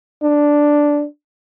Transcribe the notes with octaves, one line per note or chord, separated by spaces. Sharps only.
D4